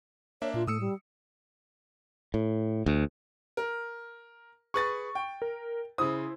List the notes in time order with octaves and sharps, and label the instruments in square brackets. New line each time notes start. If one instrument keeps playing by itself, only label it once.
[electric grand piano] A#3 D4 E5 [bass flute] C#5
[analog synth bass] A#2 [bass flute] F4
[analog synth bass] A2 [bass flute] A3 [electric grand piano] D#6 E6 C#7
[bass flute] G3
[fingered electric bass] A2
D2
[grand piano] A#4
[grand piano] G#4 B4 A6 [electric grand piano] C#6
[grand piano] G5
[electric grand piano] A#4
[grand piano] C#3 D#6 [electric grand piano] E4 C5